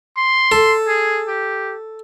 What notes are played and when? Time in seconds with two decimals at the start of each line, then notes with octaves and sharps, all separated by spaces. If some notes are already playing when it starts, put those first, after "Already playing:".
0.17 C6
0.52 A4
0.88 G#4
1.28 G4